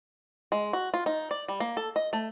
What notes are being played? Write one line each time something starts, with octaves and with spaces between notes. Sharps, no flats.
G#3
F#4
F4
D#4
D5
G3
A#3
A4
D#5
A3